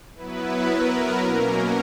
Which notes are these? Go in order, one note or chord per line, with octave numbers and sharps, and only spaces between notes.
F#3 B3 E4 B4
A#4
B2 F#3 A#3 C#4